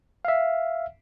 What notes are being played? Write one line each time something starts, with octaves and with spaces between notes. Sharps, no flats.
E5 F5